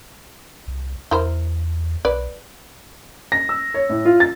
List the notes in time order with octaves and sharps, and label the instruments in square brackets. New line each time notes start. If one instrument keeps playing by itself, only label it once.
[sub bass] C2
[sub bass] E2 [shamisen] E4 A#4 C5
[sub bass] B1 [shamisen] B4 D5
[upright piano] A#6
E6
C#5
A2
F4
A6